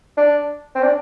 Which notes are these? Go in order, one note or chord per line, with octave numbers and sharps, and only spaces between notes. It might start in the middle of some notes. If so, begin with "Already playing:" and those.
D4
C4
D4